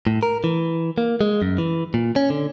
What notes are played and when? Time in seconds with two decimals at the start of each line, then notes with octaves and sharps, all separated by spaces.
0.07 A2
0.23 A#4
0.44 E3
0.98 A#3
1.21 G#3
1.42 F#2
1.58 E3
1.94 A#2
2.16 C#4
2.30 D3